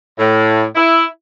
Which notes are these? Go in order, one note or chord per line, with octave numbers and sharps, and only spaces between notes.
A2
E4